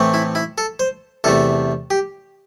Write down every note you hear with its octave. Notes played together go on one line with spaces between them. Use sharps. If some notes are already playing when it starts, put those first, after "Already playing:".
Already playing: A2 E3 A3 C4
E4
E4
A4
C5
E2 C3 A3 A4
G4